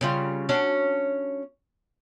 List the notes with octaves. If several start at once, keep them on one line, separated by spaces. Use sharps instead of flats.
C#3 G3 F4
C#4 D4 F#4